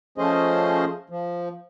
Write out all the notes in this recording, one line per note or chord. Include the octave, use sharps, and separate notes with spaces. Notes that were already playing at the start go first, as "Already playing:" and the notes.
F3 A3 C#4 G#4 C5 D#5
F3